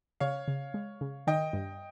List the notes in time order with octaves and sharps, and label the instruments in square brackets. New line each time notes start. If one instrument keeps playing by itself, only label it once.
[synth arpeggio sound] C#3 [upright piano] C#5 F5
[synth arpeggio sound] C#3
G#3
C#3
[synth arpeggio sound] D#3 [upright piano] D#5 G5
[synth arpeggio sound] G2